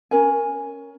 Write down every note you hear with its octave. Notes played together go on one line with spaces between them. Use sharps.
C#4 A#4 G#5